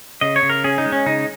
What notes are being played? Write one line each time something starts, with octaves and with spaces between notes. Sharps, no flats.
C#3 D#5
C#5
C#3
A#4
C#4 G#4
D#4
G#3
C#4
C#3 D#4